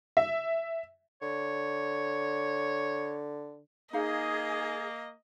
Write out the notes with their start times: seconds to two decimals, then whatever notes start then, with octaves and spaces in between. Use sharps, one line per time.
0.17 E5
1.22 D3 C#5
3.93 A#3 D#4 G#4 D#5 F5